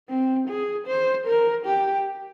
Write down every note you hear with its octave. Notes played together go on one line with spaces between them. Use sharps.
C4
G#4
C5
A#4
G4